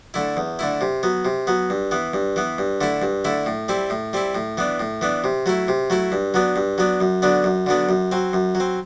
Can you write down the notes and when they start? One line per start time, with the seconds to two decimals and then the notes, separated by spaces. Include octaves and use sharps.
0.14 D3 A3 E4
0.37 E2
0.59 D3 A3 E4
0.81 C3
1.03 F#3 B3
1.25 C3
1.47 F#3 B3
1.70 G2
1.91 E3 B3
2.14 G2
2.36 E3 B3
2.58 G2
2.81 D3 A3 E4
3.02 G2
3.25 D3 A3 E4
3.46 A2
3.68 G3 C4 E4
3.90 A2
4.13 G3 C4 E4
4.35 A2
4.57 E3 B3 D4
4.80 A2
5.01 E3 B3 D4
5.24 C3
5.46 F#3 A3 E4
5.68 C3
5.90 F#3 A3 E4
6.12 G2
6.34 F#3 B3 D4
6.56 G2
6.78 F#3 B3 D4
7.01 F#2
7.22 D3 F#3 B3 D4
7.44 F#2
7.66 D3 F#3 B3 D4
7.89 F#2
8.12 F#3 C4
8.33 F#2
8.55 F#3
8.60 C4